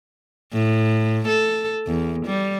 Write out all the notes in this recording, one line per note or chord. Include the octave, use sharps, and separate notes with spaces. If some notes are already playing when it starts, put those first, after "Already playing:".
A2
A4
E2
G3